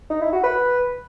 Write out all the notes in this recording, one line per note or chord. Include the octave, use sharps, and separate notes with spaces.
D#4
E4
F#4
B4